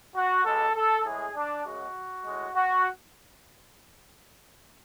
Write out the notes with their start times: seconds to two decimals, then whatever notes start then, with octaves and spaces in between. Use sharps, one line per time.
0.15 F#4
0.44 C#2 B2 G#3 A4
0.75 A4
1.04 A2 E3 G#3 G#4
1.35 D4
1.65 F#2 C#3 G#3 F#4
2.25 A2 G#3
2.55 F#4